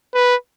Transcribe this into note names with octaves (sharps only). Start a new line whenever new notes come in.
B4